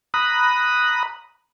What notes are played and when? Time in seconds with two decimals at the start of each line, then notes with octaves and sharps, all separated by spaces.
0.14 A#5 B5 D#6 F#6